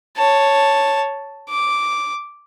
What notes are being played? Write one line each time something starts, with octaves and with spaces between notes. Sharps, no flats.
C#5 A5
D6